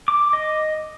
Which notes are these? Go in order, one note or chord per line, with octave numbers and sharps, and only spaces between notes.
D6
D#5